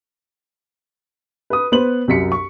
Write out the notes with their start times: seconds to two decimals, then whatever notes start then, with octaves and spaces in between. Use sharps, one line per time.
1.50 B4 D#6
1.72 B3 B4 C5 F#7
2.08 C2 F#2 B6 C#7
2.32 C#6